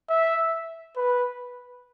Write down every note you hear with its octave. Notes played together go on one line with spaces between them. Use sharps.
E5
B4